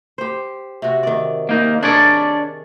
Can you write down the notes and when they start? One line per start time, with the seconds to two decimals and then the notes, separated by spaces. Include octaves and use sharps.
0.18 G4 C5
0.82 C3 F#4
1.03 D#3 D5
1.49 A#3 D#4
1.83 D4 G#4 A#4 C#5 D5